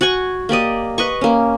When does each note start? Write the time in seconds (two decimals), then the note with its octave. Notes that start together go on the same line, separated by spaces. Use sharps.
0.01 F#4 F#5 G#5 C#6
0.49 A#3 G4 D5 D#5
0.98 B4 D#5 C#6
1.21 A#3 C#4